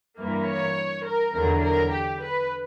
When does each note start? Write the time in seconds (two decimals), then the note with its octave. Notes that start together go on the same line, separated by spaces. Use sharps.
0.17 G2 E3 A#3
0.46 C#5
1.05 A#4
1.33 E2 D3 F#3 A#4
1.62 A#4
1.91 G4
2.21 B4